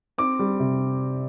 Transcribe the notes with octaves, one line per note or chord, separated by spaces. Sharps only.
C4 D6
G3
C3